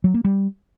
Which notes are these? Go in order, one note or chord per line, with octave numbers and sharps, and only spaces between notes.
F#3
A#3
G3